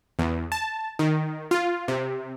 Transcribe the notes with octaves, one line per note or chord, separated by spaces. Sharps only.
E2
A5
D#3
F4
C3